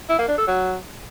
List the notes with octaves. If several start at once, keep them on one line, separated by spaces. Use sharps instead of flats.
E4
A#3
D4
A4
F#3